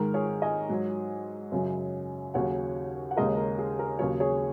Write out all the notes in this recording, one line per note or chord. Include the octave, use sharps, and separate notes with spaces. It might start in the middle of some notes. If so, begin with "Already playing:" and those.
Already playing: G#2 D#3 G#3 A#4
G#4 C#5
D#5 G#5
G#2 F#3
F#2 C#3 F#3
D#2 C#3 F#3 C#5 F#5
F#5
D#2 C#3 G#3 A#4 D#5
A#4
G#4
A#4
D#2 C#3 F#3 G#4 C#5
G#4 C#5